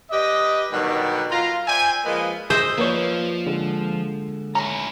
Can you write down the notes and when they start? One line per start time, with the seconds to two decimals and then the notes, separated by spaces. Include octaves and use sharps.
0.11 G4 B4 D5 D#5
0.72 B2 D3 D#3 F#3 G3
1.31 F4 A#5
1.68 C5 D5 E5 G5 G#5
2.06 F3 G#3 A#3 F4 B4 D#5
2.50 G#4 C5 D#5 E5
2.78 F3 A#3 B4 C#5 D5
3.46 D3 G#3
4.55 C#4 E4 A#5